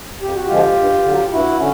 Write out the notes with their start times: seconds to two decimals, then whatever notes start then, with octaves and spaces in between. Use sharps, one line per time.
0.21 F2 G4
0.34 F#4
0.47 D3 F3 G#3 F4 G4
0.77 G2
1.03 D3
1.09 F#3
1.31 G2 E4 F#4
1.58 D3 C#4